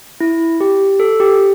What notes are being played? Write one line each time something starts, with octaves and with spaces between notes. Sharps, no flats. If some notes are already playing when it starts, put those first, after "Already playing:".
E4
G4
A4
G4